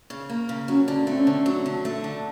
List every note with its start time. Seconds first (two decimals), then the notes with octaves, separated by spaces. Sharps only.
0.10 C#3
0.30 A#3
0.49 C#3
0.68 F#3 C#4
0.88 D3
1.07 A3 C4
1.18 C#4
1.27 D3 C4
1.46 F#3
1.66 D3
1.85 A3
2.04 D3